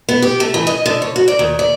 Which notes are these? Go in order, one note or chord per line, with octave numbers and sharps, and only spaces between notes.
B3
G4
A3
E3
D#5
D3
C#5
F#4
D5
D#2
D5